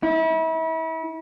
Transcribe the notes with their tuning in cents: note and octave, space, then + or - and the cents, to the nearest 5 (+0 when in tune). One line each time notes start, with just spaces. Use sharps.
E4 -35